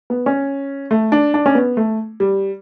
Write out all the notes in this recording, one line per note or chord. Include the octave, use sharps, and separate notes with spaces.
B3
C#4
A3
D4
D4
C#4
B3
A3
G3